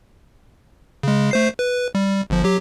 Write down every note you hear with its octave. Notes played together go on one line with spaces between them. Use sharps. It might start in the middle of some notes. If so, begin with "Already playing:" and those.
C#3 G#3
A3 C5 C7
B4
G3
G1 F3
F#3 G4